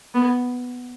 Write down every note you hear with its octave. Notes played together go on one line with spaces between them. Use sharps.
B3